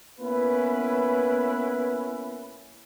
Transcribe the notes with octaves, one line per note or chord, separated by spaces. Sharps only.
A#3 B3 C#4 E4 B4